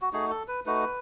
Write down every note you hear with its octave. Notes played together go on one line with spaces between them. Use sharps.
F#4
A3 D#4 F#4 G#4
A4
B4
A3 D#4 F#4 B4